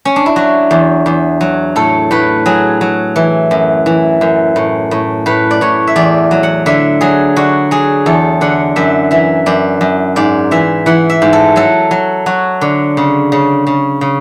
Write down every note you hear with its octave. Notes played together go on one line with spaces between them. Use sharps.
C#4
D4
E4
F#3 F#4
E2
E2
F#3
A2 A4
A2 B4
F#3 G#4
F#3
E3
F#2
E3
F#2
A2
A2
A2 B4
D5
A2 C#5
E5
E2 D5
F#3
F#5
D3 E5
F#3 G#4
D3 F#4
F#3 G#4
E2 A4
D3 F#5
F#2 E5
E3 E5
F#2 D5
F#2
G#2 D5
E3 E5
E3 F#5
E5
G#2
A4
F#3 A4
F#3
F#3 F#4
D3
C#3
C#3
C#3
C#3